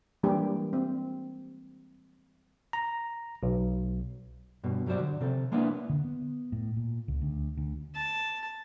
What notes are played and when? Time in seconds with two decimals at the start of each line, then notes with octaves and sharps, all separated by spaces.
0.23 E3 G3 G#3 A#3 D4 G4
0.73 C4
2.73 A#5
3.43 B1
4.64 G2 B2
4.86 G2 F#3 G3 C4 C5 D5
4.99 D3
5.20 C3 C4 A4
5.52 G#3 A#3 B3 D4 E4
5.89 D3
6.04 B3
6.52 A2
6.76 A#2
7.08 C#2
7.22 D2
7.57 D2
7.95 A5